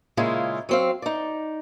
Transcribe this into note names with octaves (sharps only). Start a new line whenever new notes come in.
A#2 C#3 G#3 E4 F4 G#4
F#3 C4 F5
D#4 D5